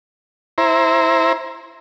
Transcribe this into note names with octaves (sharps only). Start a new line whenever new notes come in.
E4 C5 A#5